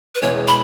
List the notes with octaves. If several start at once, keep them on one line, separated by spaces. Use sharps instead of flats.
B4
E1 E2 E3 G#3 C#5
B5